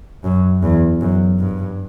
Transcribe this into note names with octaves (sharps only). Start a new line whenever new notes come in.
F#2
E2
F#2
G2